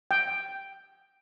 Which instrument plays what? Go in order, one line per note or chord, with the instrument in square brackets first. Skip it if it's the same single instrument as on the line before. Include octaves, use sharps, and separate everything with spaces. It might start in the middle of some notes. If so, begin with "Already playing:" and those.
[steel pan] G5